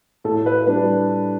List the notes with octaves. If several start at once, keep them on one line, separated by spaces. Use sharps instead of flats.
A2 A4
B4
G3 D4 B4